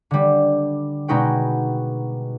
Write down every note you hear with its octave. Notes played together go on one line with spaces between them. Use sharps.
D3 G3
B2 G#3 D#4 F#4 B4 G5